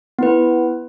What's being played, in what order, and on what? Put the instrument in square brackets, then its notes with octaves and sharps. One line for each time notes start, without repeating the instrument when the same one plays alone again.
[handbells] B3 E4 B4